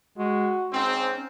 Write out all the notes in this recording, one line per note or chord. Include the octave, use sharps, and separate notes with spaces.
G#3 F#4
G#2 C4 C#4